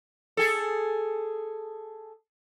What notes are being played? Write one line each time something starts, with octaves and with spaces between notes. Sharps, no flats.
G#4 A4